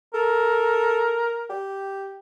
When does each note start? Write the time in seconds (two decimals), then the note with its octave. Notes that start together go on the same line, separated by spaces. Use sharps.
0.14 A4 A#4
1.50 G4